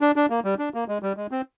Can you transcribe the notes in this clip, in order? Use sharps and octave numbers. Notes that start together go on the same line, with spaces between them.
D4
D4
A#3
G3
D4
A#3
G#3
G3
G#3
C4